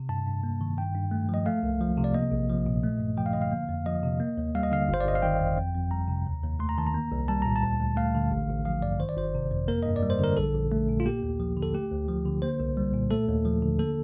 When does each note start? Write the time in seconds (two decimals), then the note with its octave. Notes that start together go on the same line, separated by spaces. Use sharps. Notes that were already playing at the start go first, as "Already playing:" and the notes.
Already playing: C3
0.09 G2 A5
0.26 G2
0.43 A#3
0.61 D#3
0.78 G2 G5
0.95 G2
1.11 A3
1.29 F3 D#5
1.46 A3 F5
1.63 C2
1.81 F3
1.97 C3
2.04 D5
2.14 A#3 D#5
2.31 A#1
2.49 F3
2.66 A#2
2.84 A3
3.00 G2
3.17 F3 G5
3.26 F5
3.33 D3 D#5
3.42 F5
3.51 A#3
3.69 F2
3.86 F3 D#5
4.03 C3
4.20 A#3
4.38 D#2
4.55 G3 F5
4.63 D#5
4.72 D3 F5
4.89 G1
4.94 C5
5.01 D5
5.05 G1 D#5
5.15 F5
5.22 D#3 G5
5.40 F2
5.58 F2
5.75 F2
5.91 G3 A#5
6.08 C3
6.26 D#2
6.43 D#2
6.59 A3 C6
6.69 A#5
6.78 D#3 A5
6.87 A#5
6.94 A#3
7.12 C2
7.28 G3 A5
7.42 A#2 A#5
7.56 A5
7.63 D2
7.80 D2
7.96 A3 F5
8.15 D3
8.31 A1
8.49 A1
8.65 F3 F5
8.82 G2 D5
9.00 D#3 C5
9.09 D5
9.17 G1 C5
9.35 C3
9.51 F2
9.68 A#3 A#4
9.83 G2 D#5
9.96 D5
10.03 G3
10.10 C5
10.19 D3 A#4
10.37 A#1 A4
10.55 A#1
10.72 A3
10.89 A#2
11.00 F4
11.06 A#3 G4
11.23 D#2
11.40 F3
11.57 D3
11.62 A4
11.74 A3 G4
11.91 D2
12.08 F3
12.26 D3
12.42 A#3 C5
12.60 C2
12.77 G3
12.94 A#2
13.11 A3 A4
13.28 D#2
13.45 F3
13.62 D3
13.79 A#3 A4